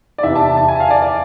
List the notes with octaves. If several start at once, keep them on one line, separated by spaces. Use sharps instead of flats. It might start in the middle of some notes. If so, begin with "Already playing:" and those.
D5
E2 C3 E3 E5
A5
A5
G#5
F5
D5
D5